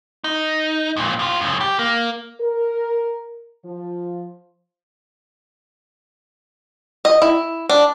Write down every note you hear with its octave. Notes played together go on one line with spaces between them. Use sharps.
D#4
F2 A#2
A2 F4
F#2 C#3
G4
A#3
A#4
F3
D#5
E4
D4